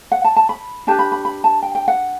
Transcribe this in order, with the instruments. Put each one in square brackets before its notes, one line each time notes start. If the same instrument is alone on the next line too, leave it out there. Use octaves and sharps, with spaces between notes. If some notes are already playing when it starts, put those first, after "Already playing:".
[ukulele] F#5
A5
A5
B5
D4 G4 B4 A5
B5
B5
B5
A5
G5
G5
F#5